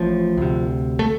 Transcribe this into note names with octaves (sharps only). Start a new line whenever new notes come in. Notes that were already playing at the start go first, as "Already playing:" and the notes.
Already playing: A1 A2 F3
D2 C3
A3